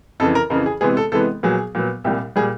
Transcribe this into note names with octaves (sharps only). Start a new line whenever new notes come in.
F2 C#3 E3 A4
A#4
F2 C#3 E3 A#4
G#4
C3 E3 G#3 B3 G#4
A4
C3 E3 G#3 B3 A4
A#2 F#3 B3 G#4
A#2 F#3 B3
C2 A#2 G3 G4
A#2 G3 G#4